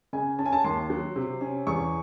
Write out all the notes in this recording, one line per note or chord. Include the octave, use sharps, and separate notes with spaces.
C#3 G#5
C#4 A5
G#5
A5
D#2 C6
F#3
C3
C#4
E2 C#6